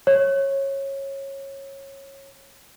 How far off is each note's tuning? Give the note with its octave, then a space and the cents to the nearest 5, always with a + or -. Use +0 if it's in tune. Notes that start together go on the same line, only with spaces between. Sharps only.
C#5 -20